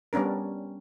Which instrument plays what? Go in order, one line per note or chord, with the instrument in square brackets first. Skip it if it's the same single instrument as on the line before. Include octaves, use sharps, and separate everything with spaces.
[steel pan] G3 B3 C#4 D4 A#4